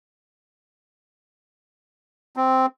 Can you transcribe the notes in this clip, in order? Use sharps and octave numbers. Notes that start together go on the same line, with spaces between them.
C4